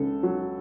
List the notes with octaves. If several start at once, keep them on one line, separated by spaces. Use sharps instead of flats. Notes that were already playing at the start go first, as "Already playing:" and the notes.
Already playing: C#2 C#3 A4
F#3